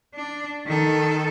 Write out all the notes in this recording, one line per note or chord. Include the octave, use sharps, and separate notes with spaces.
D4
D#3 A4